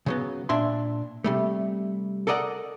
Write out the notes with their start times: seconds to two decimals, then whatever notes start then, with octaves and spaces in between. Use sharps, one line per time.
0.06 C#3 F#3 B3
0.49 A#2 D4 E5 C6
1.24 C3 G3 A3
2.27 A4 A#4 D5 D#5 F#5